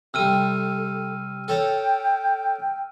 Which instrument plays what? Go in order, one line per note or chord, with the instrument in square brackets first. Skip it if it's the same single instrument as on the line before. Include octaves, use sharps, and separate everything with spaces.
[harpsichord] C3 G3 [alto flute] A4 [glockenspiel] E6 F6 D#7
[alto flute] A4
[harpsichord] A4 C#5 A#5 [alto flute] G5